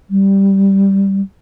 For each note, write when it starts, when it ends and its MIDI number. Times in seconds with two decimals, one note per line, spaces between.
0.10 1.21 55